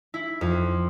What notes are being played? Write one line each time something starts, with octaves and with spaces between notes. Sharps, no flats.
E4
F2